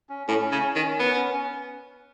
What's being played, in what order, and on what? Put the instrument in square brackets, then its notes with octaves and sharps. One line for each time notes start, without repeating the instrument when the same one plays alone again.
[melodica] C#4
[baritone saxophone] A2 [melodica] C#4
[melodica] C#4
[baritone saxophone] C#3
[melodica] C#4
[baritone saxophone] D#3
[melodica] C#4
[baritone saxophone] B3 [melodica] C#4
[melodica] C#4
C#4